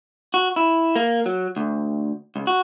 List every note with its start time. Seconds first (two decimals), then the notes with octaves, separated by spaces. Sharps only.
0.34 F#4
0.56 E4
0.96 A#3
1.26 F#3
1.56 D2
2.36 C#2
2.47 F#4